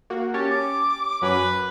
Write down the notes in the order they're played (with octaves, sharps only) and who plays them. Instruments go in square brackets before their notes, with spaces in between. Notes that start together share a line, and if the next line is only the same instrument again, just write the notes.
[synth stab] A#3 F#4
[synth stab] C#4 G4 C#5 [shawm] A5
[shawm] D6
[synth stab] F#2 F#3 C#4 [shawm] B4